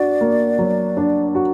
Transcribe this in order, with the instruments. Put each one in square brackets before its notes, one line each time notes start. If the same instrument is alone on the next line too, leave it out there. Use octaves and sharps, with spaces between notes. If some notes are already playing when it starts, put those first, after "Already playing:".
Already playing: [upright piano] D4 F#4 [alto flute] D5
[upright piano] A#3
F#3
D4
F#4